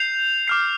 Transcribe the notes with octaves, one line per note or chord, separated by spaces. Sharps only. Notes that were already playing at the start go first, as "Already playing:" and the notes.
Already playing: G6 C7 F7
D6 F6 C7